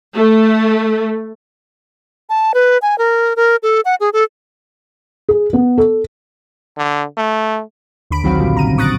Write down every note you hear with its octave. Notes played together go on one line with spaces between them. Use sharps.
A3
A5
B4
G#5
A#4
A#4
A4
F#5
G#4
A4
G#4
B3
A4
D3
A3
D#2 D3 B5 D7
B1 D#3 F#3 C4 F#4 F5
A#2 D3 F3 G3
C#3 A#5 D#7
A2
C#6 D#6 F#6 A6 A#6 D7